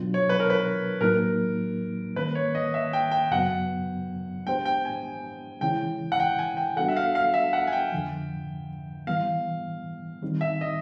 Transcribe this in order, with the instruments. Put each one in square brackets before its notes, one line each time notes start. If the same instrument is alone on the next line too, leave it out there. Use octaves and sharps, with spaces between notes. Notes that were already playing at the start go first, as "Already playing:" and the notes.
Already playing: [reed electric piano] B2 F#3 B3 D4 F4
[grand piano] C#5
B4
A#4
B4
[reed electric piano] A2 F#3 A#3 D#4 [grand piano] A#4
[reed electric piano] D#3 G3 A#3 C#4 [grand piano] B4
[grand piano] C#5
D#5
E5
G5
G5
[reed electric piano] F#2 C#3 F#3 B3 [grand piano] F#5
[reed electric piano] G#3 B3 D4 G4 C5 [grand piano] G5
[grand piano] G5
G#5
[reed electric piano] C#3 E3 G#3 C#4 E4 [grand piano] G5
[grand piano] F#5
G5
G#5
G5
[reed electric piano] G3 B3 D4 F#4 A4 [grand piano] F#5
[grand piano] E5
F5
F5
E5
F#5
G#5
G5
[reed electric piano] F2 D3 F3
[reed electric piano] E3 G3 B3 [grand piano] F5
[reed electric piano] D#3 G3 C4 D#4
[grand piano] E5
D#5